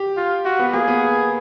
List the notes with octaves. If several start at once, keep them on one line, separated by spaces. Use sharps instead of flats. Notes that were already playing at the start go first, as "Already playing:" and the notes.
Already playing: G4
F4
F4 F#4
B3
A#3 G#4
B3